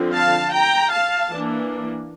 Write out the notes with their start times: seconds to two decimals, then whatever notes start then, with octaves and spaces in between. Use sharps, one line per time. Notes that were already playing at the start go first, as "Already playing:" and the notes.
Already playing: D3 F3 C4
0.13 F5 A5
0.52 G5 A#5
0.91 F5 A5
1.30 E3 A#3 D4